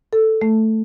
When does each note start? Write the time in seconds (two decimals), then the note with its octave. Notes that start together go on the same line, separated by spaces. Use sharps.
0.13 A4
0.42 A3